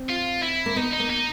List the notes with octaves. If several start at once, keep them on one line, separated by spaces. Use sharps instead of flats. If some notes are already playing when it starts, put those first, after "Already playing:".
Already playing: C4
F4
E4
A#3
B3 D#4
D#4
A#3
D#4